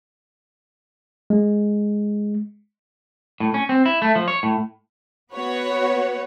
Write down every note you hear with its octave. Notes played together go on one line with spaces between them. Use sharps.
G#3
A2
C#4
C4
E4
A3
F3
C#5
A2
B3 F#4 B4 C#5 F#5